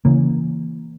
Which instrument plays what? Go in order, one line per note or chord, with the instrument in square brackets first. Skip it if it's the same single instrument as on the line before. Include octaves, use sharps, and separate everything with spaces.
[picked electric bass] C#3 E3 A#3